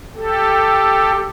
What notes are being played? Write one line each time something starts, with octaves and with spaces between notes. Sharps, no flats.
G4 A4